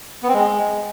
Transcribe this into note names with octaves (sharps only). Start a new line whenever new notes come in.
B3
C4
G#3